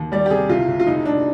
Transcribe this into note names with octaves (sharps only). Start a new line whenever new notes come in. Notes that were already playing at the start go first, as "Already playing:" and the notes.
Already playing: D#2
G3 D5
G4
C3 G#4
C2 F4
C2
F4
F1 D#4
F1 D4